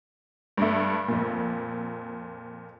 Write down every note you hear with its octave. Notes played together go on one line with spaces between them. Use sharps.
G2 A3
F2 A#2